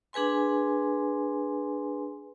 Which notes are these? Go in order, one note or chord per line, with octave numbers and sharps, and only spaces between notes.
D4 G#4 B4 G#5 C6